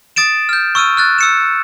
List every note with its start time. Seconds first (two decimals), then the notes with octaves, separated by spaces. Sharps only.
0.16 D#6 A6 D7 E7
0.49 F6 G6
0.75 C#6 E6 F6 D#7
0.97 F6 F#6 A6
1.18 E6 C#7 E7